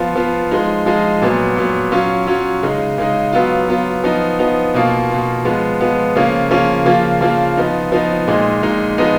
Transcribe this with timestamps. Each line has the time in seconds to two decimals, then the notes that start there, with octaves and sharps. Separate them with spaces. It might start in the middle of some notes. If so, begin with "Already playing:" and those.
Already playing: F3 B3 F4
0.16 F3 B3 F4
0.51 F3 G#3 D#4
0.86 F3 G#3 D#4
1.22 A#2 F#3 B3
1.56 A#2 F#3 B3
1.92 F#3 C#4 F4
2.27 F#3 C#4 F4
2.63 C#3 G#3 D#4
2.98 C#3 G#3 D#4
3.33 F#3 B3 F4
3.68 F#3 B3 F4
4.04 F3 B3 D#4
4.39 F3 B3 D#4
4.74 B2 A#3 F4
5.10 B2 A#3 F4
5.45 F3 G#3 B3
5.81 F3 G#3 B3
6.16 C#3 F3 A#3 C#4 F4
6.51 C#3 F3 A#3 C#4 F4
6.86 C#3 F3 A#3 F4
7.21 C#3 F3 A#3 F4
7.57 F3 B3 D#4
7.92 F3 B3 D#4
8.28 A#2 G#3 D#4
8.63 A#2 G#3 D#4
8.98 F3 G#3 B3 D#4